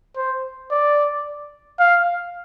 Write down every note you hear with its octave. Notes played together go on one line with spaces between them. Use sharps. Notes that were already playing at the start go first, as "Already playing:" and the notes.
C5
D5
F5